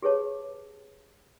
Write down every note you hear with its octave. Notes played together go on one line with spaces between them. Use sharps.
G4 G#4 B4 C#5 A5